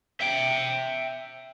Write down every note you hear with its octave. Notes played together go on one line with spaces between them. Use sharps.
E5 G5